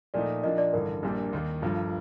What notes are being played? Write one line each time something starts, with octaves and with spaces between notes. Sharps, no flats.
A#2 F3 A3 D#4 D5
A#2 F3 A#3 D4 D#5
D5
A1 G2 D3 A#4
A#1 A#2 G3 A#3 D4
D#2 D#3 A#3
G1 G2 F3